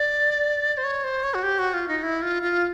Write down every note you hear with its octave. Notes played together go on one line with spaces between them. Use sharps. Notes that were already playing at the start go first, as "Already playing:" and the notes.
Already playing: D5
C5
C#5
C5
C#5
F#4
G4
F#4
F4
D#4
E4
F4
F4